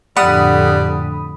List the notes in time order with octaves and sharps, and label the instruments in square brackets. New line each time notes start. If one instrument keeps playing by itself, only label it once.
[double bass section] F2 A2 D3 [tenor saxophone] G3 [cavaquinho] F#5 [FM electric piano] B5 D#6